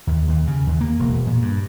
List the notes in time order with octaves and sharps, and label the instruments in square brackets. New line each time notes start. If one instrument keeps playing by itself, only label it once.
[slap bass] D#2
D#2
C#3
D#2
A#3
E1
A#2
G2